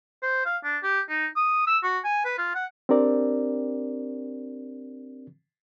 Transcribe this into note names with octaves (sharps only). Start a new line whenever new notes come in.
C5
F5
D4
G4
D#4
D#6
E6
F#4
G#5
B4
F4
F#5
C4 D4 G4 A#4 D5